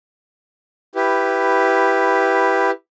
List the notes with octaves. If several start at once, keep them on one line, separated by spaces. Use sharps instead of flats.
E4 G4 B4